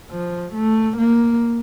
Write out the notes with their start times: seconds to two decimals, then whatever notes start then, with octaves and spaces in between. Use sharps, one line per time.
0.11 F3
0.54 A3
0.98 A#3